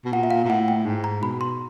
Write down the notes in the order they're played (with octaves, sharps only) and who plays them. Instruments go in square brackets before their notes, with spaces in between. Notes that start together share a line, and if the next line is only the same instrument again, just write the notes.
[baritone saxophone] B2
[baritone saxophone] A#2 [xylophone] F#5
[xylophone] E5
F5
[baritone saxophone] A#2
[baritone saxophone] A2 [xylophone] F#5
[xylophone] G5
[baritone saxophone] G#2
[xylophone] A#5
[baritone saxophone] B2 [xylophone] B5
[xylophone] C6